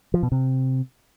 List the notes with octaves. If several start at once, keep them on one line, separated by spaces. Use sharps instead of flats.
F3
B2
C3